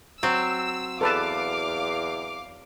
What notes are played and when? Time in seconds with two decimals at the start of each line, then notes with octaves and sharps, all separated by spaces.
0.23 F#3 C4 E6
1.01 E2 A4 B4 F5 A5 D6